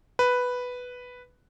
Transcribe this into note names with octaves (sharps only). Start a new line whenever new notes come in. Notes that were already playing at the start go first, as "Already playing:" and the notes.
B4